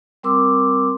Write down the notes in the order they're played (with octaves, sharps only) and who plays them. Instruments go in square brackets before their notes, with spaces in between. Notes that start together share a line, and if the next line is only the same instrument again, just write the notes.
[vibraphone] G3 C4 A#4 C6 D6 E6